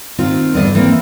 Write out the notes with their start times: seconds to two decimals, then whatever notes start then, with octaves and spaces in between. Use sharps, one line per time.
0.18 D#3 C4 F4
0.54 E2 G2 D3 B3 D4 D#5
0.75 E3 A#3 C4